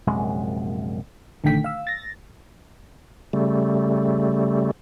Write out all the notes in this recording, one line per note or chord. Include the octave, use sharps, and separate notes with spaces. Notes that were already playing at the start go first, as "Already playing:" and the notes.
A#1 F#2 C3 G#3
A#1 D3 D#3 A3 G5 B6
F5 E6
A6 A#6
C#3 G3 A3